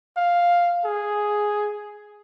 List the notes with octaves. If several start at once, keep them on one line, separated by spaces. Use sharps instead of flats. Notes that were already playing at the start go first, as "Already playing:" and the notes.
F5
G#4